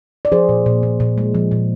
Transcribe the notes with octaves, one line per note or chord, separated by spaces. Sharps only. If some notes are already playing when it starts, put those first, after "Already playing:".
D5
F3 G#4 C5
A#2
A#2
A#2
A#2
G#3
F3
A#2